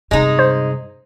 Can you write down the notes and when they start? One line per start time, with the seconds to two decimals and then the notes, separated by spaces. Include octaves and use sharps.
0.11 G2 C3 G#3 D#4
0.39 C5